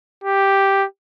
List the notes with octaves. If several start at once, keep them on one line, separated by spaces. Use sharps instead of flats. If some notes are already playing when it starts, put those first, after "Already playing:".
G4